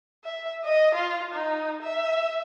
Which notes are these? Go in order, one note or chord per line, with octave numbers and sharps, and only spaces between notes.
E5
D#5
F4
D#4
E5